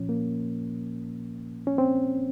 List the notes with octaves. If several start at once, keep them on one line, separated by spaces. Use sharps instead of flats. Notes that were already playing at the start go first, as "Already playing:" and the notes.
Already playing: A#2 F3 C#4
A#3
C#4
C4